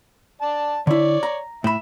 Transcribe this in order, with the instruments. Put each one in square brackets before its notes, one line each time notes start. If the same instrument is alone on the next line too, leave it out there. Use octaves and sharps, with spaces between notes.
[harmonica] D5 A5
[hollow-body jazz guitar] D3 E4 [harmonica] C#5 D5
[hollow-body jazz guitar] A#5
[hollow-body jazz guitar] A2 B5 [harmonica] E5